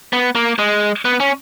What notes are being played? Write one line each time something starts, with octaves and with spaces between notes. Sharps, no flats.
B3
A#3
G#3
B3
C#4